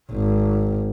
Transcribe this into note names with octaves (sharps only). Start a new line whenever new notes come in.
G#1